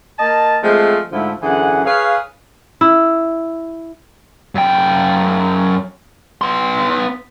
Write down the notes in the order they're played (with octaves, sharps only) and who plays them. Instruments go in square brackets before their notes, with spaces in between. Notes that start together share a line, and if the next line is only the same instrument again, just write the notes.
[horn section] A#3 D#5 A5
F3 G#3 A3 C4
G#2 D3 F3 A3 E4
F#2 D3 E3 G#4 F#5
G#4 B4 C#5 F5
[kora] E4
[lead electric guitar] F#2 G5
B3 C6